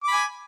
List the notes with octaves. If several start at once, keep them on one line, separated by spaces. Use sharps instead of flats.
G#5 B5 D6